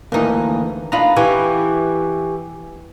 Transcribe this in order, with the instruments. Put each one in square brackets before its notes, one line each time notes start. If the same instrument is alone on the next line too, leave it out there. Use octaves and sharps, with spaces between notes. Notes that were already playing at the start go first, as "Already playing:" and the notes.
[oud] D2 D#4 [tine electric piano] D#3 E3 A#3
[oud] D4 D#4 F4 [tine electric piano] A#5 B5
[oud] E3 [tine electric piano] G4 G#5 C#6